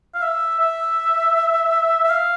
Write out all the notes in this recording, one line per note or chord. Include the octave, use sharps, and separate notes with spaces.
F5
E5
E5
E5
F5